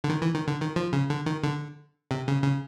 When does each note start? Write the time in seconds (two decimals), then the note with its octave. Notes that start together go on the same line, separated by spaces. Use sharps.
0.04 D3
0.09 D#3
0.22 E3
0.35 D#3
0.48 D3
0.60 D#3
0.76 F3
0.93 C#3
1.10 D3
1.26 D#3
1.43 D3
2.11 C3
2.28 C#3
2.44 C#3